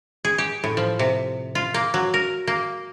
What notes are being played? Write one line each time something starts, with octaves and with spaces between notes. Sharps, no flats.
G#4
G4
A2
F3
C3
F4
A#3
F#3
A#4
A#3